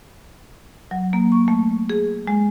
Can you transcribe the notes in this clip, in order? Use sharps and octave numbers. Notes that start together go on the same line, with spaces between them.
F#3
A#3
C#6
A3
G#4
G#3